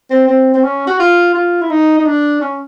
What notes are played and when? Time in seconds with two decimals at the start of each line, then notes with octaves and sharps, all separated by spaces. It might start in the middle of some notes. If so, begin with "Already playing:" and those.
0.10 C4
0.28 C4
0.54 C4
0.63 C#4
0.87 F#4
0.99 F4
1.34 F4
1.62 E4
1.70 D#4
1.98 D#4
2.06 D4
2.41 C#4